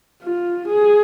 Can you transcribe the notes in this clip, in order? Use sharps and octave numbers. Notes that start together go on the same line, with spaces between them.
F4
G#4